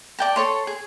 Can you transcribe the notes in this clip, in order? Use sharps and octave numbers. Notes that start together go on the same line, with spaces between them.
D5 G5 A5
A4 C#5 C6
G#4